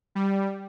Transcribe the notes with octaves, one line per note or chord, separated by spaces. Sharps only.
G3